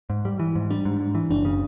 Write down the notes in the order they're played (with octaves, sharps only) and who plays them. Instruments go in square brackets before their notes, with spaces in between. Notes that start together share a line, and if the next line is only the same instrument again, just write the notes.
[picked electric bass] G#2
G3
E3
G#2
[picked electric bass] G3 [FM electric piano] D4
[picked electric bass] G#2
G#2
E3
[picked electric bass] F#1 [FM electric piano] D4
[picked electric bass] C#3